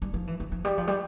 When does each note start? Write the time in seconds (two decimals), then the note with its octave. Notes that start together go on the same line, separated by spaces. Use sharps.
0.02 G3
0.14 F3
0.27 E3
0.40 F3
0.52 F3
0.65 G3
0.78 F3
0.87 G3